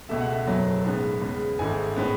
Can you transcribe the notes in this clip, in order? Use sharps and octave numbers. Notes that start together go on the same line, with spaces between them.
C#2 B2 A3 E5
F#5
E5
F#1 E2 B2 F#3 A3
B1 A2 G#3 B3
E2 C#3 G#3 B3
G#1 G#2 E3 A3 G#5
A2 G#3 B3